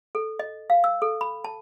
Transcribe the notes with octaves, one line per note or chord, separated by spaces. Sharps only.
A4
D#5
F5
E6
A4
B5
A5